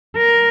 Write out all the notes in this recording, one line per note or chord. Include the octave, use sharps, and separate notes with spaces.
A#4